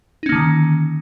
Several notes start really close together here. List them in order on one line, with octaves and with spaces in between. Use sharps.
D#4 C#4 A#3 D3 D#3